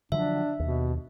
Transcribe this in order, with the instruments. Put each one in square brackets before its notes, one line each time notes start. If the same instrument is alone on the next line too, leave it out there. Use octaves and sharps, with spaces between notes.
[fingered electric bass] D3 F3 F#3 [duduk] D4 [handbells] E5
[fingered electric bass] D#2 [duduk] B2